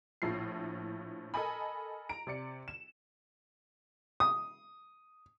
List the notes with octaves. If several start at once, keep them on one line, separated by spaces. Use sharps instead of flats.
A#1 A2 F3 E4 C7
A4 A#4 D#5 G#5 B5
A#5 D7
C3 D5 C#7
E7
D#6